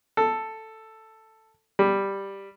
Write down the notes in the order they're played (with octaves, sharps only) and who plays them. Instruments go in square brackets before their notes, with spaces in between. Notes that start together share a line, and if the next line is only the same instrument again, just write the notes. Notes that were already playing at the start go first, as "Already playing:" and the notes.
[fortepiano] A4
G3